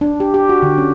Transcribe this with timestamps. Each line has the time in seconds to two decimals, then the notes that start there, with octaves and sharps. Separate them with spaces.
0.01 D4
0.20 G4
0.34 G4
0.49 F#4
0.62 D3
0.78 C#4